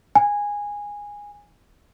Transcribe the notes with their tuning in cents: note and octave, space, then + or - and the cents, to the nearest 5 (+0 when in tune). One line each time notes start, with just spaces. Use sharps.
G#5 -15